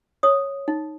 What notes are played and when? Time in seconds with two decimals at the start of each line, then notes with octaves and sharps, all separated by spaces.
0.23 C#5 D#6
0.68 D#4